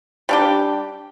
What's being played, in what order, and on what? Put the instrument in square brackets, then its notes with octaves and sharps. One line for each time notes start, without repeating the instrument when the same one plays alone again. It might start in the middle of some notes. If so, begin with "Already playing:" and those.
[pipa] G3 D4 G4